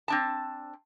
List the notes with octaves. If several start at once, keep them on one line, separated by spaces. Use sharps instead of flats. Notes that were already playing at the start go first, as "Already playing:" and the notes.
C4 D4 A5